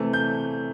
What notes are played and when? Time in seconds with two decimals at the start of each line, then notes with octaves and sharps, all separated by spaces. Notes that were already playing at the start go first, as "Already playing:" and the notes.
Already playing: C3 E3 A3
0.13 G6